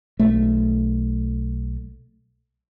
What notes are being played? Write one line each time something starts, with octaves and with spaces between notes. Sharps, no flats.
B1 A3